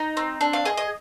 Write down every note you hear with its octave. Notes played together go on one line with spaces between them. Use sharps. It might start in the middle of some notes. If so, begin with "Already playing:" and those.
Already playing: D#4
C4
D4
F5
G#4 D#5
D#5